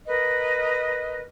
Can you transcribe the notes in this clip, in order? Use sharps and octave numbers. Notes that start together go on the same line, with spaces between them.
A#4 B4 D#5